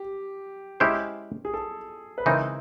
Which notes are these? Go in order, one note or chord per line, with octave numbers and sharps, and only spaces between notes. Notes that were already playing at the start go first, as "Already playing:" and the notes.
Already playing: G4
G#3 C#4 E4 G4 C5
G#4
A4
B4
C#3 E3 G#3 C4 D#4 A#4